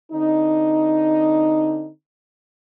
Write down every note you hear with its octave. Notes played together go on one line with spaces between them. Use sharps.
D3 C4 D#4